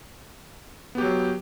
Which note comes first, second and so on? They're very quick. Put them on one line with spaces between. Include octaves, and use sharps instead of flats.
B3 G4 F#3